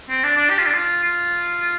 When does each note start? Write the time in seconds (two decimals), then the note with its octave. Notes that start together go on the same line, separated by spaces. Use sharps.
0.09 C4
0.24 D4
0.37 D4
0.50 G4
0.59 F4
0.67 D4
0.74 F4
1.04 F4